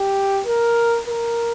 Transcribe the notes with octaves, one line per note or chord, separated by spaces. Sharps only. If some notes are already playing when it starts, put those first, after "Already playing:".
Already playing: G4
A#4
A#4